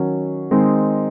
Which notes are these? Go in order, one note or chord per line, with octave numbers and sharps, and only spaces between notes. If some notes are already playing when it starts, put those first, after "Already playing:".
Already playing: D#3 F#3 C#4
D#3 G#3 C4 D#4